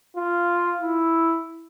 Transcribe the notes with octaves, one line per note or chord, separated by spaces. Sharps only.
F4
E4